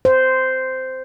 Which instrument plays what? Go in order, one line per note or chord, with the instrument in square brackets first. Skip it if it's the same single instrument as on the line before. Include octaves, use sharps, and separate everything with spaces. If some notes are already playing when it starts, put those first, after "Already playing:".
[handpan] C5